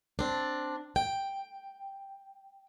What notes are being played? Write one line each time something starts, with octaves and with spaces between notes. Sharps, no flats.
C4 D4
G5